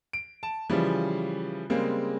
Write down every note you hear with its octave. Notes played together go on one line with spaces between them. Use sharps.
D7
A5
C#3 E3 F3 G3
C#3 G3 G#3 A#3 C4